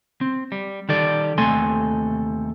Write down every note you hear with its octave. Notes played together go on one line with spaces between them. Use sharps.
C4
G3
D#3 G3 A4 D5
D#2 C3 A3 A4 G#5 C6